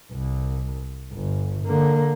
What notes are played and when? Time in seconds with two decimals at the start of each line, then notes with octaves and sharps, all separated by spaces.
0.12 C2
1.13 G1
1.64 D3 A#3